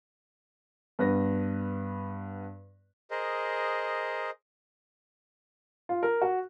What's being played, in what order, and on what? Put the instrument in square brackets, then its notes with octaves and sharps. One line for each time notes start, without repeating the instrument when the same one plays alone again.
[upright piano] G2 B3 B4 A#6
[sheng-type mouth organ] G#4 A#4 C5 D#5
[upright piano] F4
A#4
F#4